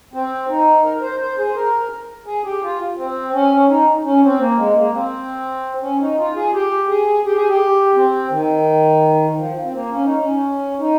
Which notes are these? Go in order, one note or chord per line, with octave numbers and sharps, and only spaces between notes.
C4
D#4
A#4
A#4
C5
C5
G#4
C5
A#4
G#4
G4
F4
C4
C#4
D#4
C#4
C4
A#3
G#3
A#3
C4
C#4
D#4
F4
G#4
G4
G#4
G4
G#4
G4
C4
D#3
F3
C4
A#3
C#4
D#4
C#4
D#4